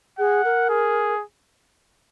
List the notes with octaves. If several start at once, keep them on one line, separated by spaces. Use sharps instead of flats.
G#4 F#5
A#4
G#4